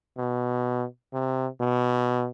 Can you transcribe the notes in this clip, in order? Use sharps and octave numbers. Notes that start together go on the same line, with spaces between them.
B2
C3
B2